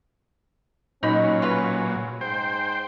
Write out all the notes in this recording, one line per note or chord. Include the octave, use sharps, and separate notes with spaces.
A#2 F#3 C#4 D#4 B5
C#3 F4 B4
G#2 C5 G5